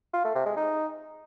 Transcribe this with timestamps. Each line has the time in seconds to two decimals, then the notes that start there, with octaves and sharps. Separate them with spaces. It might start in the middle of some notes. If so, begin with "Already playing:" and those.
0.14 F4
0.24 A3
0.35 C3
0.46 G#3
0.56 D#4